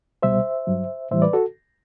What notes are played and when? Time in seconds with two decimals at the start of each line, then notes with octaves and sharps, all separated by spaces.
0.23 C2 B2 G3 C5 E5
0.67 G2 F#3
1.11 A2 E3 G3 C5 E5
1.22 B4 D5
1.33 F#4 A4